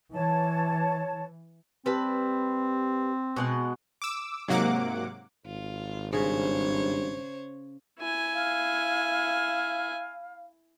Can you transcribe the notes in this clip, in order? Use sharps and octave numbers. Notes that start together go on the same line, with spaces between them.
E3 C#5 A5
G3 C4 B4 A5
B2 G#3 F#5
D6 E6
G#2 C3 F#3 A#3 F#5 D6
G#1 F4
G2 C#3 C5 C#5
E4 G#5
F5